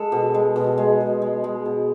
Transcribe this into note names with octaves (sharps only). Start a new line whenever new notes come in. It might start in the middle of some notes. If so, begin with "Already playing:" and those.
Already playing: G#3 A4
B2
G#3
B2
G#3
B2
G#3
G#3
B2